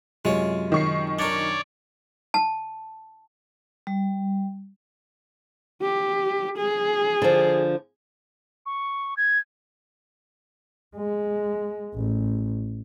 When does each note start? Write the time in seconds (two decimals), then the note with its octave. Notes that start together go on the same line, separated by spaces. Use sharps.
0.25 F#2 C3 G#3 F4 C#5
0.72 D#3 C#6 C7
1.19 D4 A#4 C#5 D5
2.34 A5
3.87 G3
5.82 G4
6.58 G#4
7.22 D3 F3
8.66 C#6
9.17 G#6
10.96 G#3
11.94 A1